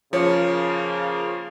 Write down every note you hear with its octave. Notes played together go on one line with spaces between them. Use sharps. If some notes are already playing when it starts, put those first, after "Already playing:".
C#3 F3 A#3 C#4 C#5